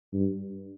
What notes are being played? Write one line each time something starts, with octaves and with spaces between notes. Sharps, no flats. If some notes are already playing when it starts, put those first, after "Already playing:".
G2